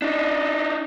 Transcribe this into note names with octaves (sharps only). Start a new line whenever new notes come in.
D4 D#4